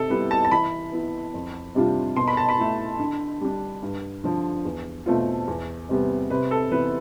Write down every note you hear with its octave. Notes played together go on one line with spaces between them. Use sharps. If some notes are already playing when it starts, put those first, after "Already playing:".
Already playing: C3 A4
G3 B3 E4 B4
A5
A5
E3 B5
B3 E4
F2
C3 G3 D4 F4
B2 C6
B5
A5
B5
A3 E4
D3
G3 D4
G2
D3 F3
E2
B2 A3 C4 F4
E2
C3 G3 B3
C3 B4
A4
E3 B3 B4